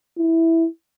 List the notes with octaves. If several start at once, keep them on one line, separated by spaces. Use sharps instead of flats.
E4